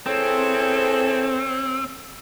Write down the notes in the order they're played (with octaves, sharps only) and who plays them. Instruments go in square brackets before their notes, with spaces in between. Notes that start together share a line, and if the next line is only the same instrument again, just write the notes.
[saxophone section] E3 G#4 A4 [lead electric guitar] C4 [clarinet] C#5